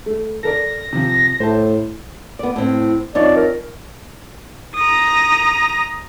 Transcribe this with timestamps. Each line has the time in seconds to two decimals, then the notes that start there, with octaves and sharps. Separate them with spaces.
0.06 A3
0.43 A4 A#4 D5 A#6
0.93 C3 F3
1.40 A2 C5 A5
2.39 B3 D5
2.56 A2 C4
3.15 F2 D#4 C#5 D5
3.36 A#4
4.75 A#5 D#6